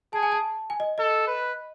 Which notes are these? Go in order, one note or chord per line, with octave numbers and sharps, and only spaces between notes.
G#4 A5
G#5
A5
G#5
D#5
A4 D#5
B4